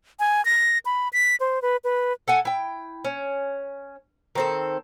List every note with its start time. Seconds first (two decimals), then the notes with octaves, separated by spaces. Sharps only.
0.20 G#5
0.45 A#6
0.85 B5
1.13 B6
1.40 C5
1.62 B4
1.84 B4
2.28 A4 F#5 G#5
2.45 E4 G5
3.05 C#4
4.35 D#3 C4 A4